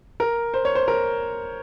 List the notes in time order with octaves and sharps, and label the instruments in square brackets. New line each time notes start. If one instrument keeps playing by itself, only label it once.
[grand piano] A#4
C5
C#5
C5
A#4